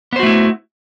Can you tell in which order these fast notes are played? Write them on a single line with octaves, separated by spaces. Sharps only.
B3 C5 F#4 A3 E4